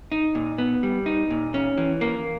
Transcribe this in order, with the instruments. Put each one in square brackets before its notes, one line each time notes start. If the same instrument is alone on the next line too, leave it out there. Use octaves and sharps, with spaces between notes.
[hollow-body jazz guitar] D#4
A#2
B3
G3
D#4
A#2
C#4
E3
A#3